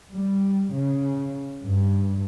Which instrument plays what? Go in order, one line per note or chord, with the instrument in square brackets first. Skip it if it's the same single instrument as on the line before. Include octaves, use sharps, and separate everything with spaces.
[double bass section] G3
C#3
G2